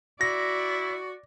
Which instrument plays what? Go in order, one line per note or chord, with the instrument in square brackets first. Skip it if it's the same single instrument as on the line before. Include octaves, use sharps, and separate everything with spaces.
[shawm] E4 [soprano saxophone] F#4 [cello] D5 [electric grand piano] A#6